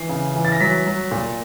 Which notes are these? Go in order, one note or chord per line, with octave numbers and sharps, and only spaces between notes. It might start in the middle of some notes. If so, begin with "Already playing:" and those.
Already playing: E3 C7
C#3
E3
A6
A#6
F#3 B6
F#3
A#2